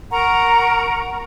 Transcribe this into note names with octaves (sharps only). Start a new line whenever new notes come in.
A#4 F#5 A#5 C#6